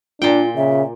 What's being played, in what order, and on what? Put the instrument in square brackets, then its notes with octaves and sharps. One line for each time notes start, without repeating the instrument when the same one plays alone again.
[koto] A#2 G5 [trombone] D4 [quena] F4
[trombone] C#3 [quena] E5